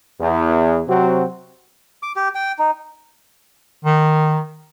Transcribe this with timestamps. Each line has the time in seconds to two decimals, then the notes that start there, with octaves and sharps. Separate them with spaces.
0.20 E2
0.88 C3 F#3 C4 F#4
2.03 D6
2.16 G4
2.35 G5
2.59 D#4
3.85 D#3